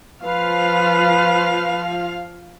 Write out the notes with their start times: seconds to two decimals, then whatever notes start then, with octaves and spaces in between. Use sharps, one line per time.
0.22 F3 F4 B4 F5